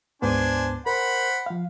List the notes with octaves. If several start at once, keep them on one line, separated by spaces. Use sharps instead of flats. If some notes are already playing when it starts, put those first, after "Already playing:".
D2 G#2 B3 D4 C5 G#5
A#4 C5 F#5 B5
F3 F5